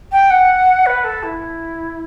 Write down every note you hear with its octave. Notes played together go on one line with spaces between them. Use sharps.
G5
F#5
B4
A4
E4